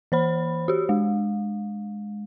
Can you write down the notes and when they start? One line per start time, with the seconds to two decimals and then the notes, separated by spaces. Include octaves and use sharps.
0.12 E3 C5 B5
0.68 F#4 G4
0.89 G#3